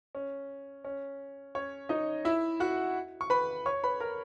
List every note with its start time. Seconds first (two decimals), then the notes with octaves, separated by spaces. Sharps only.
0.15 C#4
0.84 C#4
1.55 C#4 C#5
1.89 D#4 D#5
2.25 E4 E5
2.60 F#4 F#5
3.21 C#6
3.30 B4 B5
3.66 C#5 C#6
3.84 B4 B5
4.00 A#4 A#5